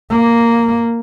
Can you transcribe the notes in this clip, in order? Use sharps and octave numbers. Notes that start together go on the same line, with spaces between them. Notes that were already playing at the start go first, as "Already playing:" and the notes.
A#3